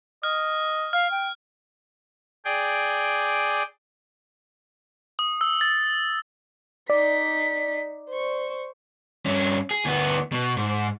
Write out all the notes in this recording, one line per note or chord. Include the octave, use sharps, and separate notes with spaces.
D#5 F6
F5 F6
G5
G#4 D5 G5
D#6
E6
A6
D#4 D5 B6
C5 C#6
G2 C#4
G#4
D2 B3
B2
G#2